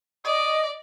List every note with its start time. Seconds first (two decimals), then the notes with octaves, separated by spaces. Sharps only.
0.25 D5 D#5 D#6